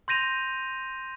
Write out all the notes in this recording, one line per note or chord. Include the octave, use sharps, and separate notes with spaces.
C6 G6 A#6 D#7 F7